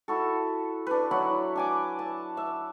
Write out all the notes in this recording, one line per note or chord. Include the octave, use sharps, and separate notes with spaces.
E4 F#4 A4
D4 B4
F#3 E4 F#5 B5
D4 G#5 D6
A5
E5